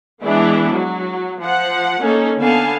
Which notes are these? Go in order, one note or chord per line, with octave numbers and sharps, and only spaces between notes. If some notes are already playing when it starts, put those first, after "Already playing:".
E3 G#3 B3 D4 E4
F#3
F3 F#5
A#3 C#4 D#4 A4
D3 B3 F5 G#5 A5